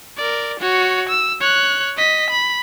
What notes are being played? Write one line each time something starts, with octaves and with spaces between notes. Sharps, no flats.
A#4 D5
F#4 C#5
E6
C#5 F#6
D#5 B6
B5